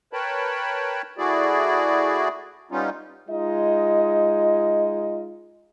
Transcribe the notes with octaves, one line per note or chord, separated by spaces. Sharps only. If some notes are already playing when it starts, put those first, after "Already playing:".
A#4 B4 C#5 G5 A5 B5
A3 E4 F#4 G#4 D5
G3 B3 C#4 D#4 F4
G#3 D#4 F4 D#5